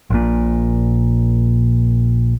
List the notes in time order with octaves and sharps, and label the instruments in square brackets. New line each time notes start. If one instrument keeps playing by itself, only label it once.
[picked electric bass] A#1 A#2